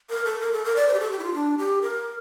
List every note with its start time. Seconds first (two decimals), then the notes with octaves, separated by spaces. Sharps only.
0.10 A#4
0.25 A4
0.40 A#4
0.53 A4
0.64 A#4
0.76 D5
0.88 C5
0.94 G4
1.00 A4
1.11 G4
1.19 E4
1.23 F4
1.34 D4
1.58 G4
1.82 A#4